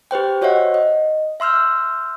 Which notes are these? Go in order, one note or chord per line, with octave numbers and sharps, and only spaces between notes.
G4 B4 C5 G5
F#4 C5 C#5 D#5 E5 F#5
D#5
E5 C6 E6 F6 G6